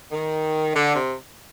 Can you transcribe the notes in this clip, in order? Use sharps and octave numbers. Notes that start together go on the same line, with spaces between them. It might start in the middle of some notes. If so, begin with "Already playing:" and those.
D#3
D3
C3